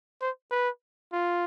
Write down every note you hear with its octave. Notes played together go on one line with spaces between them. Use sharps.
C5
B4
F4